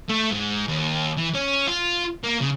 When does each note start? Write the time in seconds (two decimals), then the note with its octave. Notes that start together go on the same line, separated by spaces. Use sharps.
0.09 A3
0.31 G#2
0.68 D#2
1.17 E3
1.34 C#4
1.68 F4
2.24 A#3
2.41 C#3